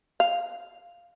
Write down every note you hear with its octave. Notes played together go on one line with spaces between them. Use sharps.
F5